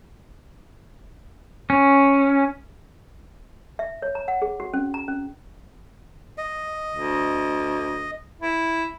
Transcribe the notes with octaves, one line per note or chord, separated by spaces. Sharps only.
C#4
E5
C#5
A#5
F#5
G#4
F#4
C#4
A#5
C#4
D#5
D2
E4